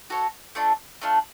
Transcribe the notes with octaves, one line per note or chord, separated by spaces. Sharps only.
F#4 A4 C#5 F#5
A3 D4 F4
A3 D4 F4